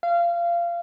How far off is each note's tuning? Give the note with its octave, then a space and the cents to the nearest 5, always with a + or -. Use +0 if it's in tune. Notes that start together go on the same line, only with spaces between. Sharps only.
F5 -25